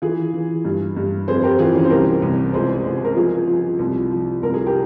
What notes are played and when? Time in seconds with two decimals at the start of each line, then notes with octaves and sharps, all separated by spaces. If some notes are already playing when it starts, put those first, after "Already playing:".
0.02 E3 F4 G#4
0.33 E3
0.65 G2
0.97 G2
1.28 F2 G#4 C5
1.39 C5
1.43 G4 A#4
1.59 E3 F4 G#4
1.75 C#4 F4
1.84 C5
1.90 C2 G4 A#4
2.22 C2
2.53 C#2 G#4 C5
2.85 C#2
3.04 A#4
3.16 F3 F4 G#4
3.48 F3
3.79 C2
4.11 F3
4.43 C2 A#4
4.54 G#4
4.66 G4 A#4